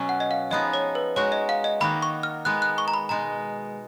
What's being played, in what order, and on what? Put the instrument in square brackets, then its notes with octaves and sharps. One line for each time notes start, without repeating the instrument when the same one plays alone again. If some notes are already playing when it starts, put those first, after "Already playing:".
Already playing: [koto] B2 F#3 C#4
[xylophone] F#5
D#5
F5
[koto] F3 B3 D#4 G#4 [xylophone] D#5
[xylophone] C#5
B4
[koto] G#3 D#4 F#4 [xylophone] C#5
[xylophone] D#5
F5
D#5
[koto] D#3 A#3 D#4 F#4 [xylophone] B5
[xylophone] C#6
F6
[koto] G#3 B3 D#4 [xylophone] F#6
[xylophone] F#6
C#6
A#5
B5
[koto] B2 G#3 D#4 [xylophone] A#5